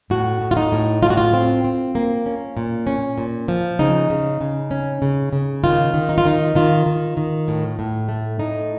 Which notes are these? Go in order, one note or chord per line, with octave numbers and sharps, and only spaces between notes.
A2 F#4
A2
F4
D#4
A2
A2 F4
F#4
F4
C4
C4
A#3
C#4
A#2
C#4
A#2
F3
C#3 D#4
C#3
C#3
C#4
C#3
C#3
D#3 F4
D#3
D#4
F4
D#3 D#4
D#3 F4
D#3
D#3
A2
A2
A3
A2 D#4